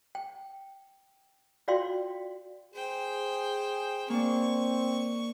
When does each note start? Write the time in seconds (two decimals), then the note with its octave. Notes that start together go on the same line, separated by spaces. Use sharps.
0.15 G5
1.68 F4 F#4 D5 F5 G5 C6
2.74 G#4 C5 G5
4.10 A#3 C4 D4 C#6